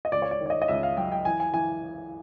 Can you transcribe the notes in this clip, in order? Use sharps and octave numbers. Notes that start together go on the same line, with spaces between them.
D#5
C#2 D5
C#5
D5
D#3
D5
D#5
D#5
C#2 E5
F5
F#3 G5
G5
E3 G#5
G#5
E3 G#5